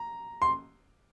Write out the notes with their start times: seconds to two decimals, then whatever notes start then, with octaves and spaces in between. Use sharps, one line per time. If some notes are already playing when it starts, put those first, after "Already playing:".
Already playing: A#5
0.42 C6